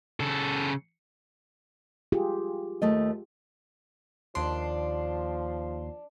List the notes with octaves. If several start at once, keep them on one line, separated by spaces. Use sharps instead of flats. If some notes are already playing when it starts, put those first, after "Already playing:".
C#3 A4
F4 G4 G#4
D#2 A3 D#5
D#2 F3 D4 C6